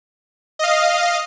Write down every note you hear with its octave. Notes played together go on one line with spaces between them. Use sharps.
D#5 F5